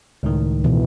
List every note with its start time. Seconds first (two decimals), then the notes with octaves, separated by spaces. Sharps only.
0.23 C#2 A2 D#3
0.64 B2 E3